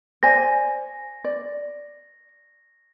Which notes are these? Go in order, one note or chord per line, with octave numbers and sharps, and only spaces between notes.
C5 D5 G#5 A#6
D5